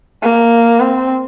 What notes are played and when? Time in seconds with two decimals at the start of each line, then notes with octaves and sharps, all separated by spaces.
0.23 A#3
0.80 C4